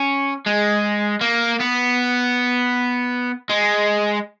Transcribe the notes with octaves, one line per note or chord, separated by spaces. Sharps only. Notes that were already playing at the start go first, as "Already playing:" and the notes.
Already playing: C#4
G#3
A#3
B3
G#3